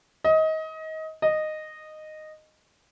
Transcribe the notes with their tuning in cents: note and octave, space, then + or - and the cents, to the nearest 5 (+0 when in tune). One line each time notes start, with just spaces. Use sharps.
D#5 +25
D#5 -10